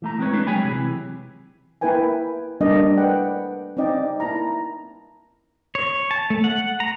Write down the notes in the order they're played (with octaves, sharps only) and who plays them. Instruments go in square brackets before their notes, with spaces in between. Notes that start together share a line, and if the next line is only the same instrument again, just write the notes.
[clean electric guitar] E3 A3 A#5
G#3 C4 E4 B4 C#5
G#3 A3 D4 B4
F#3 G#4 C#5 G5 G#5 B5
C3 E3
[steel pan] A#3 E4 A#4 B4 G5 G#5
G3 A3 A#3 D4 D5 D#5
B4 F#5 G5
C4 C#4 D#4 D5 D#5 G5
A#3 E4 A5 A#5
[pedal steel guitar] C#5
A5
A3
F#5
A#5